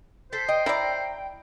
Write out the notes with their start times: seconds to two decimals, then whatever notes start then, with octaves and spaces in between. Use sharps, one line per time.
0.33 A4 C5 B6
0.49 D#5 G5
0.66 E4 D5 A#5